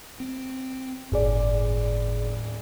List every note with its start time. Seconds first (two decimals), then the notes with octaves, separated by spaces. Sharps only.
0.20 C4
1.12 G1 D#2 A2 G#4 D5